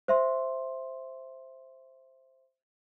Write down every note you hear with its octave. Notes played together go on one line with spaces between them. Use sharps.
C5 E5 C6